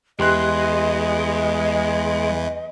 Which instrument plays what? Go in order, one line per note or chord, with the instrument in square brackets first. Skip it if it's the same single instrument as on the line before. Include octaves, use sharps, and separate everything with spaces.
[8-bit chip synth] E2 E3 [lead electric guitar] G#3 [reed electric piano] G4 C6 F#6 [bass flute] D#5